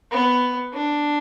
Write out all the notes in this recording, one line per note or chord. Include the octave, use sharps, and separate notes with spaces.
B3
D4